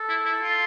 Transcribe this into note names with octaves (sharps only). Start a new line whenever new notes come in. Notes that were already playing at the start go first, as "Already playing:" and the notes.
Already playing: A4
E4
E4
F4